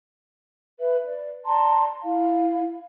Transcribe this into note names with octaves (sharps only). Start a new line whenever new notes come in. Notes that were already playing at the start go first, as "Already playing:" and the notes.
B4 E5
D5
D5 A5 A#5 C6
E4 F5